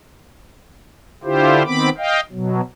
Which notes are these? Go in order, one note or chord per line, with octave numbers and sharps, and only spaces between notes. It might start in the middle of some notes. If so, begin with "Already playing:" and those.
D3 E4 F4 G4 C5
D#3 B3 C4 B5 D6
D#5 F5 G5
B2 F#3